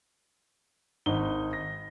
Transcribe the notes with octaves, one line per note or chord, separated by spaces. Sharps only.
G#1 D#4 G7
A#6